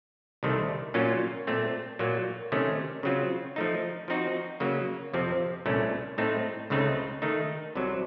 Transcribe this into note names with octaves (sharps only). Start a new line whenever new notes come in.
C2 C3 D#3 A3
A#2 F#3 A#3 C#4 F4
A#2 A3 C4
A#2 F#3 A#3
C3 D#3 A3 C#4
C#3 F#3 C4 F4
F3 A3 D#4
F3 C4 D#4 F#4
C#3 F#3 A#3
F2 C3 F3 C4
C2 A#2 A3 C#4
A2 A3 C4 D#4
C#2 C#3 A3 C4 D#4
D#3 A3 D#4
C2 C3 F#3